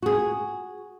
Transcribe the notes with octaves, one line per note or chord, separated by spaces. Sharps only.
F#4 G#4